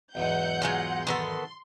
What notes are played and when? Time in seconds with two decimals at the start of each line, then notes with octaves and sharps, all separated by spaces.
0.15 B1 E2 G#2 F#5 G6
0.62 F#3 G#3 F4
1.07 D#3 B3 A4 C6